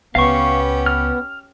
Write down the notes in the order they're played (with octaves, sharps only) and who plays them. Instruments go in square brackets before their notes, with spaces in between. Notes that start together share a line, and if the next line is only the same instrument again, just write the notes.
[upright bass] C#2 [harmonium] B3 [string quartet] C#4 G4 [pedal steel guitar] F5 C#6
[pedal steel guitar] F6